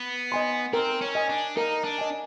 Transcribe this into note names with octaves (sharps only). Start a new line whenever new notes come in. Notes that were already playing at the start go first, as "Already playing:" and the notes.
Already playing: B3
D#5 G#5 C6
C4 A#4
C#4
D#5 G#5
D4
D#4 A#4
D4
D#5 G#5